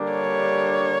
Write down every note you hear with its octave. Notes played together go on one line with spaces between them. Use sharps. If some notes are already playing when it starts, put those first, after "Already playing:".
Already playing: D3 G3 A#3 D4 G4
C#5